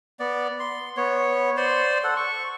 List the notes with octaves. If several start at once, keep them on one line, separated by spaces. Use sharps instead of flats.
B3 D5
C6
B3 C#5
C5 D5 C6
A4 F#5
C#6